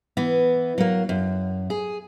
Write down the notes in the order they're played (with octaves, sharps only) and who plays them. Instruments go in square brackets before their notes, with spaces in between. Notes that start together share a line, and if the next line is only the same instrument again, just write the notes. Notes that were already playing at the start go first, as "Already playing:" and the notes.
[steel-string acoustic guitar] E3 B3
F#3 A#3
F#2
G#4